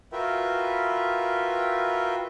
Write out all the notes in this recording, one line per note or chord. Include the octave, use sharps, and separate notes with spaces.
F4 F#4 A#4 B4 E5 G5